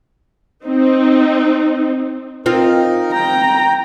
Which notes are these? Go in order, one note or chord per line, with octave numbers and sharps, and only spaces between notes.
C4 D#4
C4 D#4 F4 A#4
G5 A#5